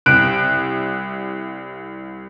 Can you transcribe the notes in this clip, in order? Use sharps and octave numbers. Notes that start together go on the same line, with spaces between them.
C2 F#6 D7